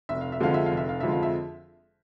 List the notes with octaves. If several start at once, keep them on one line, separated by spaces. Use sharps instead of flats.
F1 E5
F5
E5
F2 D3 F3 G#3 F5
E5
F5
F1
E5
F5
F2 D3 F3 G#3 E5
F5
E5